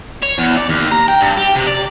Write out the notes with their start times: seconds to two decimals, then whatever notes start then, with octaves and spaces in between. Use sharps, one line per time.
0.22 C#5
0.38 E2
0.57 D5
0.69 D#2
0.92 A#5
1.08 G5
1.21 G2
1.37 G4
1.55 C3
1.67 D5